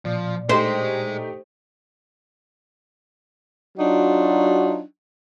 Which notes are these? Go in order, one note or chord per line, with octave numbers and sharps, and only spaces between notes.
A#2 F3 D5
A3 D#4 G4 G#4 C5 D#5
F#3 D4 D#4 F4 F#4